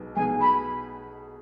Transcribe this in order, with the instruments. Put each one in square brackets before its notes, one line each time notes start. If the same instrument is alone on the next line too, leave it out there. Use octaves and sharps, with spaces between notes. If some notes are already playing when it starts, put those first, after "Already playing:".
Already playing: [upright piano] B1 B2 B3 D#4 G#4
[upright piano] B1 B2 B3 D#4 G#4 [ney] G#5
[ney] B5